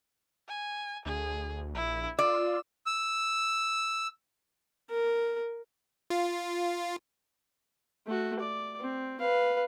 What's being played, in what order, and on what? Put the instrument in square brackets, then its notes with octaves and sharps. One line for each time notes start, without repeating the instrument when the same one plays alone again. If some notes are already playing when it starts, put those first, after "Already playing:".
[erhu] G#5
[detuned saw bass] D2 [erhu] G#4
[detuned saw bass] A#1 [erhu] E4
[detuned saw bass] F4 [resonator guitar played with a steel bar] D5 [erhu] E6
[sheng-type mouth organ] E6
[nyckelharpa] A#4
[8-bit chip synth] F4
[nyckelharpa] A3 F#4
D5
C4
B4 F5